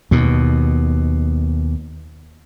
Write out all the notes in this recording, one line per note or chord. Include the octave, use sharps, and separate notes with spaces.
D#2 B2